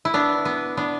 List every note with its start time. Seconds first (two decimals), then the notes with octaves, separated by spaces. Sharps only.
0.05 E4
0.14 B3 D4
0.45 B3
0.77 B3 D4